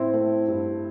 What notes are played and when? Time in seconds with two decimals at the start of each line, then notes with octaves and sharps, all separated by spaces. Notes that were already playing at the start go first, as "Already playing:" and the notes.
Already playing: A2 C4 E4
0.14 A3
0.48 G2